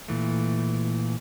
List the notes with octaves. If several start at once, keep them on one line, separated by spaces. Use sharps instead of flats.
A#2 E3 A3